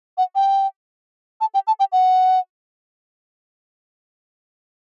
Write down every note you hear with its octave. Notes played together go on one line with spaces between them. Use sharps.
F#5
G5
A5
G5
A5
G5
F#5